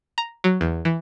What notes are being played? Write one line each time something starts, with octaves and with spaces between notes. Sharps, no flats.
A#5
F#3
E2
E3